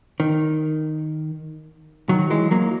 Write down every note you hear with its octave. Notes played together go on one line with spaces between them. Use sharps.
D#3
D#3 F#3
E3 G#3
F#3 A#3